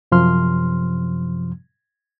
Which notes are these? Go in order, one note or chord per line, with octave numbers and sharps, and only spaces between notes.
F#2 C3 F3 C6 F6